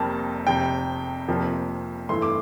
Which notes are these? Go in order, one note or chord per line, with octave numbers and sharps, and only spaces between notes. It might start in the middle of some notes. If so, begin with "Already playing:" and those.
Already playing: F1 F2 C3 G3 A#3 A5
F1 F2 C3 G5
F1 F2 C3 F3 A#3
G2 E3 A3 C6
D6